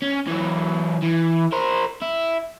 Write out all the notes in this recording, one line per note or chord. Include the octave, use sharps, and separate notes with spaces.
C#4
E3 F#3
E3
A#4 C5
E4